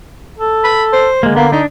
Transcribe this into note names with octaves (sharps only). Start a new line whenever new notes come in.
A4
B5
C5
D3 G#3 A#3
A#3 B3
D4 D#4